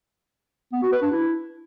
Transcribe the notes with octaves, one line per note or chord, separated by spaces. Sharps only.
B3
F#4
B4
D4
E4